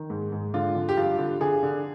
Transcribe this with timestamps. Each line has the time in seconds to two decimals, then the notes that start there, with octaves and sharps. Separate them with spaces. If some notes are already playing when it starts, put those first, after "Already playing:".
Already playing: D#3
0.10 G#2
0.32 G#2
0.54 D3 F4
0.75 D3
0.89 G4
0.97 G2 F4
1.18 D3
1.40 D3 G#4
1.63 D3